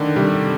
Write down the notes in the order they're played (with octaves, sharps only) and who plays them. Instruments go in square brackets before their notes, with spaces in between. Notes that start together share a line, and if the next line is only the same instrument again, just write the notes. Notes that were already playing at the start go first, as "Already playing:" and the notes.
Already playing: [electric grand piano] D3 D#3 [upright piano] A3 D4
[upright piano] C3 [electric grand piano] G3